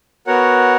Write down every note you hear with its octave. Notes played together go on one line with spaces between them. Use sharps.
B3 F#4 A#4 C#5 F#5